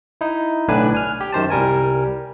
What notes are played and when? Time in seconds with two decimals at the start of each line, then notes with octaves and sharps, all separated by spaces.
0.21 D#4 E4
0.68 B1 A2 D3 D4 B4 G#5
0.95 G#5 F6
1.21 G4
1.33 F#2 D#3 C5 A5
1.50 C2 G3 A#4 G#5